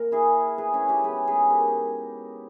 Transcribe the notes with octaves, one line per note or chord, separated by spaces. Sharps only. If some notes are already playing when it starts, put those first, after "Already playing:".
Already playing: A#3 A#4
E4 G#4
G#4 B4
C#4 E4
D#4 G4
B2 G#3 G#4 B4
G#4 B4
G4 A#4